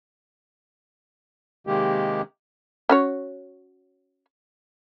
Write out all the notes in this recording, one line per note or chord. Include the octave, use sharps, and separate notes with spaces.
C3 D#3 G#3 A#3 G4
C#4 F#4 C#5